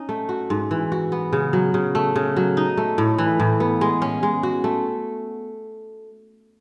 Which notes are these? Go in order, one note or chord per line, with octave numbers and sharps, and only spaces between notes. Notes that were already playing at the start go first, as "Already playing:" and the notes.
Already playing: C#4 D#4
A3
F#4
G#2
E3
F#4
B3
C#3
F#3
C#3
A3
C#3
F#3
D#4
A3
A2
E3
A2
B3
G#3
C#4
G#3
F#4
A3